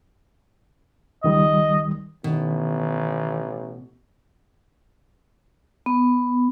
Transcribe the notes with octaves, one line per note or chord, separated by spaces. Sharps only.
C#2 D#3 G3 D#5
A1 B2 D#3
B3